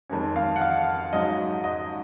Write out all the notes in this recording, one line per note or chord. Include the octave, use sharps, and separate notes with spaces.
F2 D#3 G#3 C#4
F5
F#5
F5
G#2 F#3 C#4 D#5
D#5